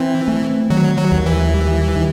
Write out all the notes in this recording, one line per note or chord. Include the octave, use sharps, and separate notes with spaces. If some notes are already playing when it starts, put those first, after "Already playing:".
Already playing: E3 C4
A3
D#3 F#3
F#3
D#2
E3
G3
D#3